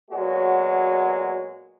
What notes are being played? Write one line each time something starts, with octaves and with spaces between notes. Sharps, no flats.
A#2 F#3 G#3 B3 F#4